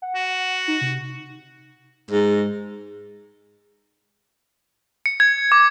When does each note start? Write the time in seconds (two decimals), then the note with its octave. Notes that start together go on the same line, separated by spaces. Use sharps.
0.02 F#5
0.15 F#4
0.68 D#4
0.81 C3
2.11 G#2
5.06 C#7
5.20 G#6
5.52 D6